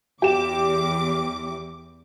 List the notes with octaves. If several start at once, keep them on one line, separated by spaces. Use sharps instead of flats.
E2 G4 D6 E7